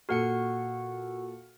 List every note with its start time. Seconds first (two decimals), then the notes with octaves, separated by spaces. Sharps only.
0.09 A#2 F#4 A4 F#5 F6 C#7